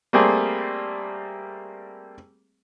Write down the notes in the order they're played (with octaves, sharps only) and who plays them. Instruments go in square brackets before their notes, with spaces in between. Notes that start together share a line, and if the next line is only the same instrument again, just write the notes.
[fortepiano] G3 A3 A#3 C4 G#4